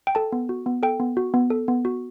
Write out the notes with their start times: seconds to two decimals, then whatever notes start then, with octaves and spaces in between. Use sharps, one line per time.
0.07 G5
0.15 A4 A5
0.32 B3
0.49 F#4
0.66 B3
0.83 A4 G5
1.00 B3
1.17 F#4
1.34 B3
1.50 A4
1.68 B3
1.85 F#4